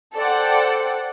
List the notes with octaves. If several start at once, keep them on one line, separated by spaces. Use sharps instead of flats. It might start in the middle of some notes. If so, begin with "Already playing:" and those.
A4 C5 D5 F#5 G5